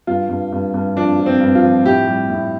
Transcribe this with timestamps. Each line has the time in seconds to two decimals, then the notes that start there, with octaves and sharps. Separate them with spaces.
0.07 G2 F4
0.29 G2
0.52 G2
0.74 G2
0.96 F3 D4
1.19 F3
1.26 C4
1.40 G2
1.55 F4
1.63 F3
1.85 A2 G4
2.07 G3
2.30 A2